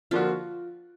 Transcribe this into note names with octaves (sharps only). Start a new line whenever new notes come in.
D3 F3 A#3 D4 F4 F#4